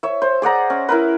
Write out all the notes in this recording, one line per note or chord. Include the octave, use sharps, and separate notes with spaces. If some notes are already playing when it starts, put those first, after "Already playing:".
C#5 E5
C5
G#4 D5 F#5 A#5
C#4
E4 A#4 B4